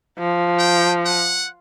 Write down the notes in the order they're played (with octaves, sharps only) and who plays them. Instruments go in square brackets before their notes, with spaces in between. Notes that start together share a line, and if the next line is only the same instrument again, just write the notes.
[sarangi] F3
[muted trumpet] G5
F#5